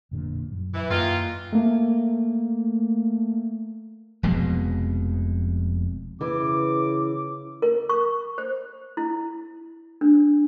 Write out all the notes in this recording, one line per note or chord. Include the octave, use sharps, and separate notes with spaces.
F1 A#2 D3
F#2
E3
F#2 D#3 E3 A#3 F4
A3 A#3
F1 F2 B2 G#3
C#3 E3 D6
A#4
C#6
C5
E4
D4